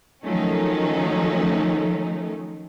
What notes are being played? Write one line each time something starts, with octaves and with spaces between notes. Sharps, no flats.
D#3 F3 F#3 A3 C#4 D#4